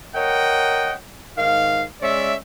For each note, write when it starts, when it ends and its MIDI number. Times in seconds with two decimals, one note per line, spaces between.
0.15 0.94 70
0.15 0.94 73
0.15 0.94 75
0.15 0.94 78
0.15 0.94 79
1.37 1.84 44
1.37 1.84 51
1.37 1.84 77
2.02 2.35 56
2.02 2.35 61
2.02 2.35 74
2.02 2.35 76